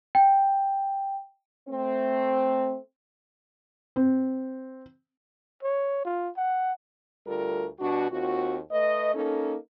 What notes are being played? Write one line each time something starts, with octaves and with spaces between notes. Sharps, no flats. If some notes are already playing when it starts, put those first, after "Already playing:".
G5
A3 C4
C4
C#5
F4
F#5
D2 G3 F4 A4 A#4
B2 G3 D4 F#4
D#2 C4 F4 F#4
A3 B4 D#5
A#3 C#4 D#4 A4